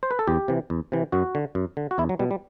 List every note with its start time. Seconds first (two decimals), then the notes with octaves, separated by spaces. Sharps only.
0.03 C5
0.11 B4
0.19 A4
0.27 E2 G4
0.48 C3 E3
0.70 E2
0.92 C3 E3
1.12 F#2 F#4
1.35 D3
1.55 F#2
1.77 D3
1.91 F#4
1.98 E2 E4
2.09 F#3
2.19 B2 G3
2.31 G3